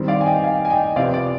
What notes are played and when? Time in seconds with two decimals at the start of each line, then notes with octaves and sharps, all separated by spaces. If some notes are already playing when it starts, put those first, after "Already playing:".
Already playing: D#3 G3 C4
0.08 D5 F5
0.21 G#5
0.26 D#5 G5
0.43 F5 G#5
0.65 G#5
0.70 D#5 G5
0.96 C3 F3 B3 D5 F5
1.14 D5